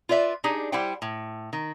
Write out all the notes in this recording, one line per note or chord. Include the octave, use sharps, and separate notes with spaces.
F4 B4 D5 E5
D4 D#4 G4 G#4
G3 E4 G4 C5 F#5 G5
A2
D#3